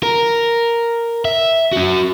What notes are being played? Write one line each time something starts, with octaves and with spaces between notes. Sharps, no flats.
A#4
E5
C#4 F#4